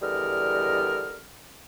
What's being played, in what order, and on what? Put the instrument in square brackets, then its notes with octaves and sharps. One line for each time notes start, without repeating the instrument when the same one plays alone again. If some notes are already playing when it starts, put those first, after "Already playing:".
[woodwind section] E2 D3 G3 A#4 D#5 F6